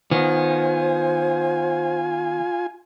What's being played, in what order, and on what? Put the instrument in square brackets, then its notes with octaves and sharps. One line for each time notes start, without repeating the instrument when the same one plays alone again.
[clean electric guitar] D#3 B3 [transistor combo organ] F4 G#5 [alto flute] C5